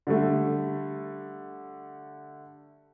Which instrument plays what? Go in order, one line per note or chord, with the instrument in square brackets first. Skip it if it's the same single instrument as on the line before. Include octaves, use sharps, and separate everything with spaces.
[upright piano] D3 G3 A3